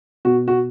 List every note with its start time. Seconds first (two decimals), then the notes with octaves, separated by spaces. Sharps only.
0.25 B2 F#4
0.48 F#4